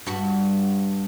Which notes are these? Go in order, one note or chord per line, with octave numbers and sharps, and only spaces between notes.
G2 F#4